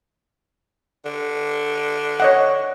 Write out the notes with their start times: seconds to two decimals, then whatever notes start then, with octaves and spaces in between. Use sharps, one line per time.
1.05 D3
2.20 C#5 D#5 F#5